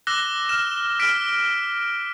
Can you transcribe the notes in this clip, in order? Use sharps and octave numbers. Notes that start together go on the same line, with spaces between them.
D6 E6 F#6 A#6 G7
F6 E7
F6 B6 D7